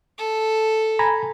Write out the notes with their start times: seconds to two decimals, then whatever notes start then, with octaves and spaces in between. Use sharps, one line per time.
0.18 A4
0.99 G#5 A#5 B5